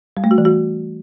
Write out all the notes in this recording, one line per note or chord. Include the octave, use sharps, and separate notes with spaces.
G3
A3
F#4
E3
F#4